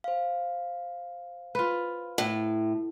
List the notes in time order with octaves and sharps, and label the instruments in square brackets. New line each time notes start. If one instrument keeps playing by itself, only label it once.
[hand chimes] C5 F5
[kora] F4 B4
[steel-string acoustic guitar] A2